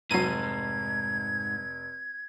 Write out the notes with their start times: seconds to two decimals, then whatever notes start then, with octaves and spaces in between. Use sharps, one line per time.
0.11 F1 G#2 F#3 G#6 C7 D#7